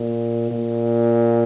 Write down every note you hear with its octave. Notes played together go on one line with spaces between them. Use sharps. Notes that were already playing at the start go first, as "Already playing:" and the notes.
Already playing: A#2
A#2